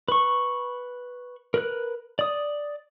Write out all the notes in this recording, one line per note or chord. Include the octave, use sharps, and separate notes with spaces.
B4 C#6
A#4 B4 F#6
D5 D#6